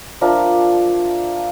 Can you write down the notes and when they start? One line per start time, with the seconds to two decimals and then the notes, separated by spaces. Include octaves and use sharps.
0.21 F3 D4 A#4 E5